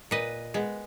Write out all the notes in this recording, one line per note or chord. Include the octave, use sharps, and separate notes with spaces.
A#2 B4 D#5
G#3 B3